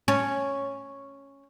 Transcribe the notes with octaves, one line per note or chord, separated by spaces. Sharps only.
C#4